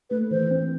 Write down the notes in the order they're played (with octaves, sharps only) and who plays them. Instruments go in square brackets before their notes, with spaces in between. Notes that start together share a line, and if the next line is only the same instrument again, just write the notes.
[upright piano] A3 [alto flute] B4
[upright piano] E3 [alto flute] C5
[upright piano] C4